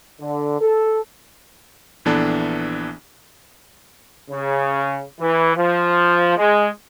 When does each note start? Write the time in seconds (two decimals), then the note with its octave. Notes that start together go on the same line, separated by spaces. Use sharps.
0.20 D3
0.60 A4
2.05 A#1 E3 B3 D4 A4
4.30 C#3
5.20 E3
5.55 F3
6.37 G#3